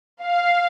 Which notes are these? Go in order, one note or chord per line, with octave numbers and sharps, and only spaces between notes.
F5